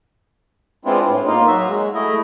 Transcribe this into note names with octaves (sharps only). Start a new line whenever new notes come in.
G#3 B3 C4 D4 E4 F4
A2
A#3 D#4 F4
F#3 F#4 E5
G#3
A3 E4 D#5